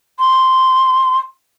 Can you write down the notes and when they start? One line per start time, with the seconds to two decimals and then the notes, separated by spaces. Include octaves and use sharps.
0.19 C6